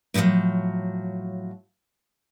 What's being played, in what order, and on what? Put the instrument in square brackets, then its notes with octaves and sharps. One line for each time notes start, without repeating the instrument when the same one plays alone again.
[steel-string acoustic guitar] A2 C3 D#3 F3 F#3